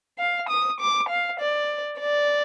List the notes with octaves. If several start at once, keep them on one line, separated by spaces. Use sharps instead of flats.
F5
D#6
D6
F5
D5
D5